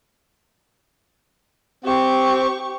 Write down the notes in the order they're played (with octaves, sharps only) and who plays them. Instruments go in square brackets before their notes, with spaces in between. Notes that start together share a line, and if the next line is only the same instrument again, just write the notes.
[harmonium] C4 [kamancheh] G4 C#6